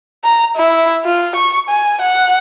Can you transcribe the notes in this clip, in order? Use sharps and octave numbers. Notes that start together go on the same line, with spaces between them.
A#5
E4
F4
C#6
G#5
F#5